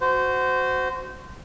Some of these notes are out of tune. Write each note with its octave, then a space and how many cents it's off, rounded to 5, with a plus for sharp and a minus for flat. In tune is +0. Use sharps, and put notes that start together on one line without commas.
F#4 +0 C5 -20